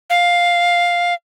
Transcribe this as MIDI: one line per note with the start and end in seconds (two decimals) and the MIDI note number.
0.10 1.14 77